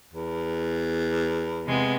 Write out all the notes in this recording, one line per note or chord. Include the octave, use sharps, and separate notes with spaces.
E2
C3 G#3 B3